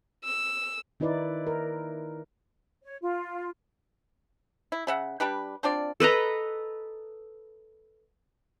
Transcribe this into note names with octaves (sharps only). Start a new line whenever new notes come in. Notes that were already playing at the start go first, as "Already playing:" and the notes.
E6
D#3 D#4 E4 B4 D5
A#4
C#5
F4
E4
C#3 E5 F#5
G3 D4 G4 B4
C4 D4 F4 D5
A4 B4 D#5 A#5